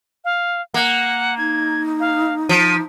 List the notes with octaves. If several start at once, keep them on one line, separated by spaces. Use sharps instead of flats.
F5
A#3 F#5
D#4 G#6
F5
F3 D#7